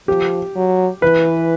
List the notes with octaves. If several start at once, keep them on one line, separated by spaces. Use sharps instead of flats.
F3 G4
F#3
E3 B4